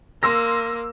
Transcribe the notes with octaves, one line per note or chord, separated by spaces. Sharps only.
A#3 C6 E6 A#6